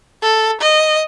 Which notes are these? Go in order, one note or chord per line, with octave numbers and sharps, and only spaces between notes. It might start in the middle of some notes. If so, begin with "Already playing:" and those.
A4
D#5